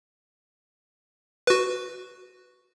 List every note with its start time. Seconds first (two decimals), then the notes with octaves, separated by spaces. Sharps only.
1.47 F#4 B4